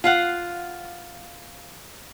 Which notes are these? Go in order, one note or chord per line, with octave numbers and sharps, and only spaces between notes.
F4 F5 F#5